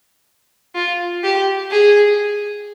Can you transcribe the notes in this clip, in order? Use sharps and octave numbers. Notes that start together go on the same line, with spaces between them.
F4
G4
G#4